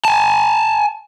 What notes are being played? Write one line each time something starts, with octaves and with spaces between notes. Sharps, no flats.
G#5 A5